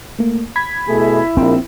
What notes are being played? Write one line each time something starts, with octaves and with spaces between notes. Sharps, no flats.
A3 A#3
B5 G#6 B6
B2 A3 E4 G#4
A#1 C4 A#4